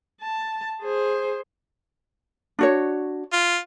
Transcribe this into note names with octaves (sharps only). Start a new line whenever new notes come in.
A5
G#4 C5
D4 F#4 C#5
F4